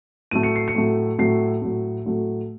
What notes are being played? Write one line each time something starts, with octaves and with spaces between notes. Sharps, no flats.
A2 F#3 A3 D#7
C#7
C7
C#7
A2 F#3 A3
A2 F#3 A3 C7
A2 F#3 A3
A2 F#3 A3